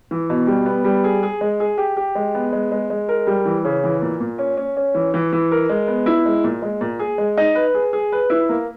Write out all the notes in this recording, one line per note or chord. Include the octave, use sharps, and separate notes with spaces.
E3
B2
G3
B3
G3
G#4
G#4
G#3
G#4
G4
G4
G#3
B3
G#3
G#3
G#3
A#4
G3
E3
C#3
E3
A#2
A#2
C#4
C#4
C#4
E3
E3
E3
A#4
G#3
B3
E4
G#3
A#2
G#3
A#2
G#4
G#3
D#4
B4
G#4
G#4
B4
E4
A#3